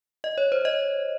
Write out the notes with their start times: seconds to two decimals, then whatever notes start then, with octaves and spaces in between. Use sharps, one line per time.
0.24 D#5
0.38 C#5
0.52 C5
0.65 D#5